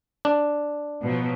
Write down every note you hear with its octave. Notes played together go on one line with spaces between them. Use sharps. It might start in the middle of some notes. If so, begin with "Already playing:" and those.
D4
B2 F3 F#3